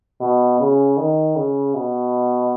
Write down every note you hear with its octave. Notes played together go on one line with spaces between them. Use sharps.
B2
C#3
D#3
C#3
B2